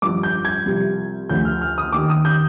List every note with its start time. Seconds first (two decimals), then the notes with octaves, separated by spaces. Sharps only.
0.02 G2 F3 D6
0.23 G6
0.45 G#6
0.66 C2 C3 F3
1.29 D2 D3 F3 G6
1.45 F6
1.61 F6
1.78 D#6
1.92 D#2 D#3 D6
2.10 D#6
2.25 G6